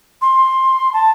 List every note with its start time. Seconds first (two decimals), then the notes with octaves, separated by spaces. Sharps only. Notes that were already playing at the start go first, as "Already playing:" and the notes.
0.21 C6
0.93 A5